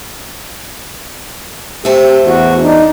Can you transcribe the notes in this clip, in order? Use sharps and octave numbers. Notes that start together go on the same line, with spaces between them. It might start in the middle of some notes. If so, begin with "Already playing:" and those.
A3 G4 C5
E2 F#4
D4 D#4